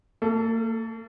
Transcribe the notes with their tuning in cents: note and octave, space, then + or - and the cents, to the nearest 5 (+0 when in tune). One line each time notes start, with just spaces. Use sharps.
A#3 -45 A4 +0